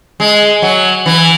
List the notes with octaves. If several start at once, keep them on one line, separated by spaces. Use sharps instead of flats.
G#3
F#3
E3